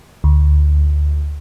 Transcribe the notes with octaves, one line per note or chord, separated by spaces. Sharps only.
D2